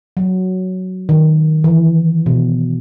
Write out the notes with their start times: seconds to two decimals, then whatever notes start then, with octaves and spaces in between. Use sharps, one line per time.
0.17 F#3
1.09 D#3
1.64 E3
2.26 B2